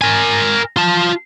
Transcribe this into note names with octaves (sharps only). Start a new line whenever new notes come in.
A#4 G#5
F4 A5